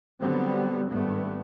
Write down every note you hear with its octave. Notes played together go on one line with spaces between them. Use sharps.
D3 F#3 G3 B3 C4
G#1 G2 A3 B3